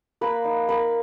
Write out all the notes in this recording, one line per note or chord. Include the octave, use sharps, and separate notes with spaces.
A#3 B4
D#4
A#3 B4